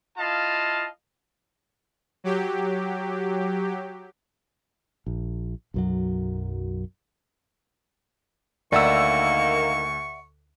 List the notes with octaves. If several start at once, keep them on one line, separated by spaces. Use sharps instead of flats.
E4 F4 D#5 F5 A5
F#3 G4
A#1
B1 F#2 F#3
D2 D#3 A#3 D5 E5 F#5 C#6 E6